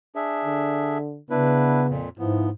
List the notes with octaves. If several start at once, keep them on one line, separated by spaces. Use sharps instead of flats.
D4 G#4 E5
D3
C#3 B3 D4 E4 B4
F2 A#2
G#2 F3 B3 E4